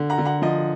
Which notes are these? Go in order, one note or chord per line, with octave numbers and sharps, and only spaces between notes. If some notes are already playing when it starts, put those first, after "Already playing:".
Already playing: D3
F#5 A#5
D3
F#5 A#5
F3 D#5